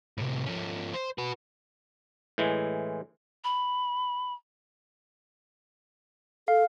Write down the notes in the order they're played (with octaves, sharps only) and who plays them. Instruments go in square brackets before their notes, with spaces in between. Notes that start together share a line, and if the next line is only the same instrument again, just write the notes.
[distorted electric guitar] A2 C3
F3 C#4
C5
F#4 B4
[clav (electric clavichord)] A2 E3 G#3
[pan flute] B5
[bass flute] A4 [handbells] F5